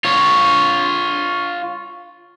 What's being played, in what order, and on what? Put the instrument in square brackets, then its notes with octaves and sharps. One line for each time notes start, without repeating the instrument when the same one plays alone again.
[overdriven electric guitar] F4 C#5